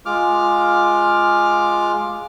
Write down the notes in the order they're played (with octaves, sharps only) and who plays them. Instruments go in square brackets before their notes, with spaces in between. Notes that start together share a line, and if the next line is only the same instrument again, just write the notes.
[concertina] G#3 F4 D6 F6